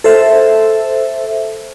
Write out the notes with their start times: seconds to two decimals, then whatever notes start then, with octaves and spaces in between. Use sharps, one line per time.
0.04 A4 C5 E5